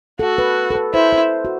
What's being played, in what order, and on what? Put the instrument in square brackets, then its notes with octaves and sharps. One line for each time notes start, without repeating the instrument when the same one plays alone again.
[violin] F#4 [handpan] A4
[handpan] B4
A4
B4
[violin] E4 [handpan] C5
[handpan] C5
F#4